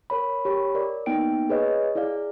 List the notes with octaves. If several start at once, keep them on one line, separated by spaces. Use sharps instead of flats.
A#4 C#5 B5
G4 C#5 B5
A#4 D5
A#3 B3 D#4 G5 D7
G#4 B4 C#5 D#5
E4 G#4 D5 F5